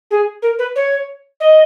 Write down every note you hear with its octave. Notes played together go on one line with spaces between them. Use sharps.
G#4
A#4
B4
C#5
D#5